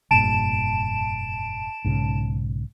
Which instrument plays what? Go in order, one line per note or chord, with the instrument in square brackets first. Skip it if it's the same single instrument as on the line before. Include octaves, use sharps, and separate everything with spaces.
[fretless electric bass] F1 G2 A#2 [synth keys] A5 D7 E7
[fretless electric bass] B1 G#2 C#3